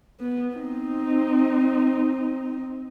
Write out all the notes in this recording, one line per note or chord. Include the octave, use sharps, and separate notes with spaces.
B3
C4 D#4